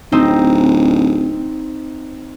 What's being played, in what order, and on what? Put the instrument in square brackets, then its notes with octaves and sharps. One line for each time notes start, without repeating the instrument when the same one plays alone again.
[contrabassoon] D1 [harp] C4 D#4